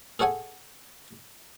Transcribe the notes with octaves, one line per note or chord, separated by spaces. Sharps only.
G#4 A4 C#5 F#5 G#5